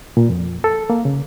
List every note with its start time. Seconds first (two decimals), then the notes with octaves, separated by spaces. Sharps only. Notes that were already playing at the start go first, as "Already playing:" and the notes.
0.17 A#2
0.29 F2
0.64 A4
0.90 A#3
1.05 C#3